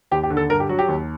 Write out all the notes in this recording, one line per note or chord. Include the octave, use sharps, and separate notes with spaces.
D#2 G4
G4
D3
A4
G2 A#4
G4
F#3 F#4
G4
D#2